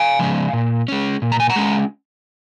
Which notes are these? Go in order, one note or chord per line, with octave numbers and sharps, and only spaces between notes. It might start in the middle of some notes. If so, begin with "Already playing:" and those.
Already playing: F5 G#5
C#3 F3 G#3 C#4
A#2
G#3 C#4
A#2
A#5
G#5
F#5 A#5
G#3 C#4